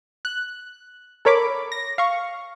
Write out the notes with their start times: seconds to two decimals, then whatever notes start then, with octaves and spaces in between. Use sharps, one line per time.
0.25 F#6
1.25 A4 A#4 C#5 B5 D6
1.72 A#6
1.98 F5 C#6